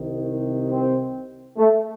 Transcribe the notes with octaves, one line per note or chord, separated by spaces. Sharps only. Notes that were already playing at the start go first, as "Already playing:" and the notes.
Already playing: C2 C3 D#3
C4
A3